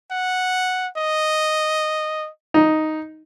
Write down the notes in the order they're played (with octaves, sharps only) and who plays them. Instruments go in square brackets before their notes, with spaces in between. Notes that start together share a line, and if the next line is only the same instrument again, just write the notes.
[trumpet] F#5
D#5
[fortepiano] D#4